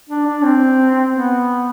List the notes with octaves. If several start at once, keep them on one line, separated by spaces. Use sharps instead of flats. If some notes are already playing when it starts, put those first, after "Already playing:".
D4
D4
C4
B3